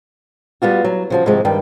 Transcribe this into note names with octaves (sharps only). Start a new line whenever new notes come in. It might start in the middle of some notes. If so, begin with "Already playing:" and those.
G3 B3 F4 F#4
F#3
C#3 F3 F#4
G#2 C3 D#3 F3 G#3
G2 D#3 G3 G5